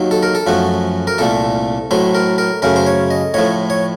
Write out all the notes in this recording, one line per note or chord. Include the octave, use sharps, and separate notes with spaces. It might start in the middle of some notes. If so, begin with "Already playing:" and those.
Already playing: D#2 D#3 F#3
A4
A#4
A4
F#2 F3 A3 F#4
A#4
C2 A#2 A3 A4
A2 F#3 A3 C5
A#4
A#4
F#2 C#3 A3 A#4
C5
C#5
D#5
A2 F3 A3 C#5
C#5